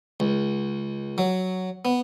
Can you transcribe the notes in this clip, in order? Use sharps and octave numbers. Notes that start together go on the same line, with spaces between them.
C#2
F#3
B3